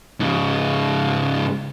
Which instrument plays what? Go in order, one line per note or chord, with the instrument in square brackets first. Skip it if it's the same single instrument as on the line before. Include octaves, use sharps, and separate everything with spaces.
[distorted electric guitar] G#2 C#3